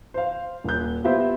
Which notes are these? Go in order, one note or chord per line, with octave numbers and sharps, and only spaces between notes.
C5 F5
D#1 G6
B3 F4 G4 C5 E5